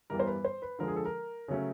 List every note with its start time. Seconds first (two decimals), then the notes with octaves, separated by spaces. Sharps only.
0.10 G2 E3 G3 B3 A#4
0.20 C5
0.27 B4
0.44 C5
0.62 B4
0.79 D3 F3 G#3 A#4
0.88 G#4
0.96 A4
1.05 A#4
1.48 C#3 F#3 A3 C#4